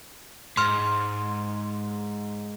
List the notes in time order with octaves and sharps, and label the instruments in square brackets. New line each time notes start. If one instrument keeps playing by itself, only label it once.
[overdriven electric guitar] G#2 [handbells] C6 F6